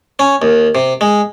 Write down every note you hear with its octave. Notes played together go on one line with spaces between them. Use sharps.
C#4
D#2
C3
G#3